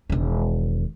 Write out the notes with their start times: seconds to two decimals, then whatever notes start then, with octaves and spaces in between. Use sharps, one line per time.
0.10 E1 D#3